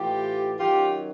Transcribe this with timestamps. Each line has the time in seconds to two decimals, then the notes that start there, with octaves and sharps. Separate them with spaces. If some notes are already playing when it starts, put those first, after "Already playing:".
Already playing: A2 E3 F4 G4
0.59 F#2 D#3 F#3 F4 G4